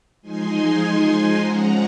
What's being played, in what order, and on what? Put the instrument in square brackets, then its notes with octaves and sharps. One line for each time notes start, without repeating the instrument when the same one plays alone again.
[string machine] F3 G#3 D#4 G#5 C6
G#5 C6
F3 G#3 C#4 F#5 A#5